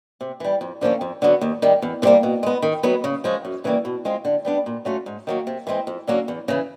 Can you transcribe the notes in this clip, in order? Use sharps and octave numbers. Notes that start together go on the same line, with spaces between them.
C3
E3 G3
F2
D3 F3 A#3 C#4
F2
D3 F#3 B3
D#2
D#3 G3
E2
C3 E3 G3 A#3
B2
G#3 B3
D#3
F#3 B3 D#4
C#3
F3 G#3 C#4
F#2
C#3 E3 G3 A#3
B2
G#3 C4 F4
D3
G3 B3 D4
A#2
F#3 A3 C#4 F4
G#2
D#3 F#3 A#3
C3
E3 G#3 C4
F2
D3 F#3 A#3 C#4
E2
C#3 E3